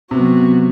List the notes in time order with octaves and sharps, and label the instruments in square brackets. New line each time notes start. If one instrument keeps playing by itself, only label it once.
[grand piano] C3 [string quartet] F#3 B3 F#4